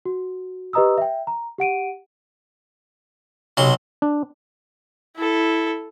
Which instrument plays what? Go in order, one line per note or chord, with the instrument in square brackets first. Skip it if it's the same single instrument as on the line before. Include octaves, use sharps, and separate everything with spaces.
[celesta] F#4
G4 B4 D#5 A#5 D#6 E6
E5 G5
A#5
G4 F#5 D7 D#7
[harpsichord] B1 F#3 C6 [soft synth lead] C3
[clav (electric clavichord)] D4
[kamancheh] E4 A4